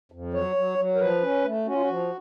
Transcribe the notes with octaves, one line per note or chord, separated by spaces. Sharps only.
F2
F#3 C#5
F#3
F#3
A#4
F3 B4
C#4
A3
C#4 F#4
F4
F#4
F3